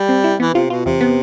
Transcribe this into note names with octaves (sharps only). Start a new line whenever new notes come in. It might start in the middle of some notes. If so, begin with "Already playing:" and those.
Already playing: G3
C4
E4
E3 B3
C3 F4
B2 F4
E2 C3
B3